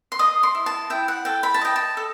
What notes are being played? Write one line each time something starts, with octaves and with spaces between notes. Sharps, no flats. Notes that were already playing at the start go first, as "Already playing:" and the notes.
C6
D#5 D#6
C6
E4
A5
E4 G5
F#5
A4 G5
B5
A5
D#5 G5
A5
A4